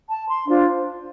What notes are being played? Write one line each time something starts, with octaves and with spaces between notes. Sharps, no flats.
A5
C6
D4 F4 C5